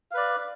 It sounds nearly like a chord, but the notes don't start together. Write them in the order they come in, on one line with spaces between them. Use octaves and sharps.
F5 B4 D5